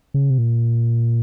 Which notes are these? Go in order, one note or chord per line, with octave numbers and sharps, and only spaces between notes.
C#3
C3
A#2